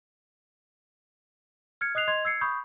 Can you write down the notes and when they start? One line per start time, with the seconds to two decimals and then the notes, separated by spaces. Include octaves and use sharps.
1.81 F6 G#6 C#7
1.95 D#5 D#6 F#6 C7 F7
2.08 D#5 C6 G#6 F7
2.25 E6 G#6 C7 C#7
2.41 B5 C#6 D#6 G6